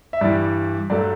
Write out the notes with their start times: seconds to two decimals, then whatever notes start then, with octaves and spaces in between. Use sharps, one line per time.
0.13 E5
0.21 G2 E3 G3 D5
0.90 G2 F#3 A3 D5